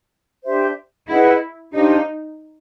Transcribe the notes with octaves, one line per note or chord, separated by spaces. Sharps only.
D4 G4 C5 E5
E4 G#4 B4 D#5 F#5
D4 D#4 G4 C5 F5